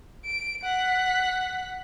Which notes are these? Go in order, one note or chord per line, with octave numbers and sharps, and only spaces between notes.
D7
F#5 B6